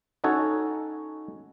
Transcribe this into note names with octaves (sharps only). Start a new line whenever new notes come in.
C#4 D#4 F#4 A4 C#5